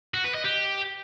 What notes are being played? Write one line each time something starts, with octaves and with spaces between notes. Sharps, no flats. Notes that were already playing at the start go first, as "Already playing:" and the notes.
F#4
B4
D#5
G4